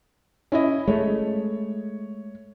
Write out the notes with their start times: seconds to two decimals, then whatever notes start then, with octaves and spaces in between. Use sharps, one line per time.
0.52 C#4 E4 D#5
0.88 G#3 A3 C#5